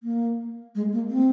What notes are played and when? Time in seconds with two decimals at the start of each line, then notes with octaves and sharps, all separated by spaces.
0.03 A#3
0.75 G#3
0.93 A#3
1.10 C4